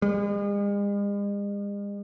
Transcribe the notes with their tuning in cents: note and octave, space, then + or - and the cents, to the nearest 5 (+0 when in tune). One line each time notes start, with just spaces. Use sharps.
G#3 -45